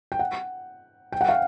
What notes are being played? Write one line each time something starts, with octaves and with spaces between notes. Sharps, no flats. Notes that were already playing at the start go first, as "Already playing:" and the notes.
G5
F#5
G5
F#5
F5